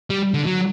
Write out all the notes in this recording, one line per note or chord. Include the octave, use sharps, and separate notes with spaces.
G3
D3
F#3